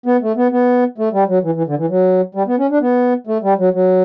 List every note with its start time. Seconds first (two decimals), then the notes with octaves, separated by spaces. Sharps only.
0.06 B3
0.22 A3
0.37 B3
0.52 B3
0.98 A3
1.13 G3
1.28 F#3
1.43 E3
1.55 E3
1.67 D3
1.78 E3
1.89 F#3
2.35 G3
2.47 B3
2.59 C#4
2.70 D4
2.81 B3
3.27 A3
3.43 G3
3.58 F#3
3.73 F#3